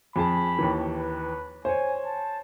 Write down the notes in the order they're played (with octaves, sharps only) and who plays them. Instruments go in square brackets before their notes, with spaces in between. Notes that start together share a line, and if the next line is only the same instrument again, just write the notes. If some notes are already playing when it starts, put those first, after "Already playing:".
[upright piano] F2 G#4 A5 [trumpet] B5
[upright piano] D#2 D#3 E3
[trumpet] B4
[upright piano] C5 C#5 [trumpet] G#5
[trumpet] A5